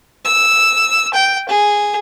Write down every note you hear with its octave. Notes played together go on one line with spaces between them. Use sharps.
E6
G5
G#4